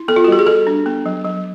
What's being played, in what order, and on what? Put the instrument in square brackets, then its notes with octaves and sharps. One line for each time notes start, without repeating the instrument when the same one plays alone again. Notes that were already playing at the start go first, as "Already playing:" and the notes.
Already playing: [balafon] E4
B3 A4
F4
F#4
G3 G4
G#4
G3 A4
D4
B3
F#3
F#3